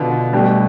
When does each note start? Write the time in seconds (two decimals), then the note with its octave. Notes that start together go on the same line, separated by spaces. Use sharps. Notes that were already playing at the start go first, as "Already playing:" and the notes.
Already playing: B2 D3 B3 F4
0.33 B2 G3 A3 D4 G4